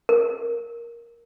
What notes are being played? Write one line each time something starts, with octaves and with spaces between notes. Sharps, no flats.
A#4